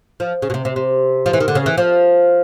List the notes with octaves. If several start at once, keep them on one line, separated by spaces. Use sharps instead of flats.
F3
C#3
B2
C3
C3
C3
F3
E3
D#3
D3
C#3
E3
F3